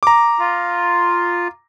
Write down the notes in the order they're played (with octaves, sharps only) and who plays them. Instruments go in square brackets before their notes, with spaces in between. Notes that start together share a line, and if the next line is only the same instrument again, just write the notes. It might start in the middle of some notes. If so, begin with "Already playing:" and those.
[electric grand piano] A#5 D6
[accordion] F4